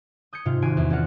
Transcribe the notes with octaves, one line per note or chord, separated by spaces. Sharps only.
D#6 G6 G#6 C#7
G#2 C3 F4
G#1 F#4 G#5 C7 D7
E2
C#4 F4 A#4 C5 D5 F#5